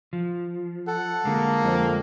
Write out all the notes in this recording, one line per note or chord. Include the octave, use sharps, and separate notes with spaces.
F3
A4 F#5
D3 G#3 A#3
F2